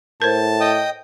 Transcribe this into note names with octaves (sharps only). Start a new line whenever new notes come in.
A2 A#4 C5 A5
D#5 G5 D#6